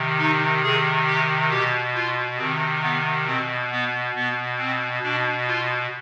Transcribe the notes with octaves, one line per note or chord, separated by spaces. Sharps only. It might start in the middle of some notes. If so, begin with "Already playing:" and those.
Already playing: C3 D#3
D#4
C3 D#3 G#4
G4
B2 G4
F4
C3 D#3 C4
B3
B2 C4
B3
B2 B3
C4
B2 D4
F4